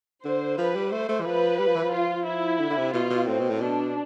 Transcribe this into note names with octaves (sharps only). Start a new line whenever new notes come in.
D3 C5
F3 B4
G3
A3 C5
A3
E3
F3 B4
G3
F3
E3
F3
F4
E4
D3
D3
C3
B2 F4
B2
A2 C4
B2
A2
B2 D4